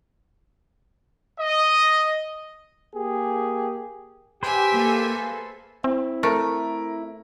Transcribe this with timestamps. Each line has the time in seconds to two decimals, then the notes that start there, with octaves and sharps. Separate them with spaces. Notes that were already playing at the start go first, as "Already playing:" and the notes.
1.39 D#5
2.95 A#3 G4 G#4
4.43 G4 G#4 B4 C5 E5 G#5
4.73 A#3 A4
5.84 C4 E4
6.23 A3 A#4